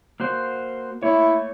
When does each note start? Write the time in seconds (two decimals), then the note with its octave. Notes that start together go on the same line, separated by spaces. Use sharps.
0.20 A#3 F#4 C5
1.03 A3 A#3 E4 C#5